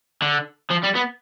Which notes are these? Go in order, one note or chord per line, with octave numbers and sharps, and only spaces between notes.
D3
F3
G3
B3